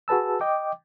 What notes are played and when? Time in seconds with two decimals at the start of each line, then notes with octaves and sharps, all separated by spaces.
0.08 F#4 G#4 B4 A5 E6
0.41 D#5 G5 D6